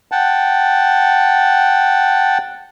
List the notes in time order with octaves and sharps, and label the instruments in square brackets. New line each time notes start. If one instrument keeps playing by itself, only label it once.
[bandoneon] F#5 G5 A5